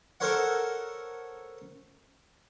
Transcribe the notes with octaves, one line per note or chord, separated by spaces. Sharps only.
A4 A#4 C5 C#5 F#5